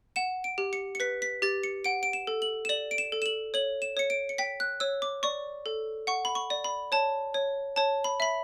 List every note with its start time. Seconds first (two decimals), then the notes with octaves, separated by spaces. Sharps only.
0.16 F#5 E7
0.44 D7
0.58 G4
0.73 C#7
0.95 C#7
1.00 B4 B6
1.22 B6
1.42 G4 A6
1.63 C#7
1.84 F#5 D7
2.03 D7
2.13 E7
2.27 A4
2.42 F#7
2.65 E7
2.69 D5 F#7
2.91 D7
2.98 E7
3.12 A4
3.22 E7
3.26 F#7
3.54 C#5 F#7
3.82 E7
3.97 C#5 C#7
4.10 D7
4.29 C#7
4.38 G5 B6
4.60 F#6
4.80 C#5 E6
5.02 D6
5.23 D5 C#6
5.66 A4
6.07 F#5 C#6
6.25 B5
6.35 C#6
6.50 D5
6.64 B5
6.92 C#5 A5
7.34 C#5
7.76 C#5 A5
8.04 B5
8.20 E5 B5